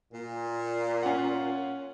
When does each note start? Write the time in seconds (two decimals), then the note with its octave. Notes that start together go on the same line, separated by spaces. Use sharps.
0.13 A#2
1.03 C#4 F4 F#5